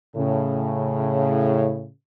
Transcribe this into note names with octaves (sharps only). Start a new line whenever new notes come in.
A2 C#3